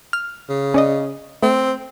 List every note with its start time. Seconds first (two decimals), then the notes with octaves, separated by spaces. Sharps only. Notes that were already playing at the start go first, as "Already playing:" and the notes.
0.13 F6
0.49 C#3
0.74 C#4 D5 D#5
1.43 A3 C4